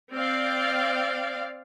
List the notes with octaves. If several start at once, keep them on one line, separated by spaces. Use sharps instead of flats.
C4 D5 F5